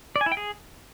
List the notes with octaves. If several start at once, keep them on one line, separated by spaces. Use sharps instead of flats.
D5
G#5
E4
G5
G#4